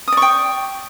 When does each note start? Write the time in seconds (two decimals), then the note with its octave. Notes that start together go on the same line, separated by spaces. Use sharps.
0.08 D#6
0.12 D5
0.17 C#6
0.22 G5